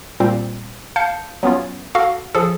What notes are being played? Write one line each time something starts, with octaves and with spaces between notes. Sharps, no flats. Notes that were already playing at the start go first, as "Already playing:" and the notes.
A#2 G3 C4
F5 A5 G6 C#7
F#3 B3 C#4 F4
F#4 A4 F5
F3 G#4 A4